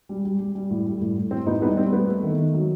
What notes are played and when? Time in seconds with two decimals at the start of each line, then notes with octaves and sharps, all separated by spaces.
0.09 G3
0.25 G3
0.40 G3
0.55 G3
0.70 A2
0.86 G3
1.01 A2
1.17 A2
1.31 A2 C4
1.47 A2 B3 D#4
1.62 G3 B3 D#4
1.77 G3 C4
1.93 A3 B3
2.08 A3
2.23 D#3
2.38 D#3
2.53 F#3